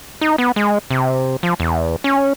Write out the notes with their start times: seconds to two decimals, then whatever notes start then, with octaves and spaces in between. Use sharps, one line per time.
0.21 D#4
0.38 B3
0.56 G#3
0.90 C3
1.43 F3
1.60 E2
2.04 C#4